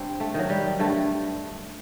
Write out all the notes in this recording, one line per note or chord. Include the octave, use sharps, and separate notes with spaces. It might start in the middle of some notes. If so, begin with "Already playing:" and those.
Already playing: G2 C4
A3
D#3 F#3
G3
G2 A3